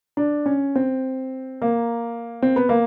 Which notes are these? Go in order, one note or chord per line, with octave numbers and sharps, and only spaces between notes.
D4
C#4
C4
A#3
C4
B3
A#3